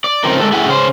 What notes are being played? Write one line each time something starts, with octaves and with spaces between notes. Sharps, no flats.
D5
C#3 F3 A3 C4 D#4 A#4
G#3 D4 A4 A#4
A3 E4 G4 G#4 F#5
C#3 C#4 C5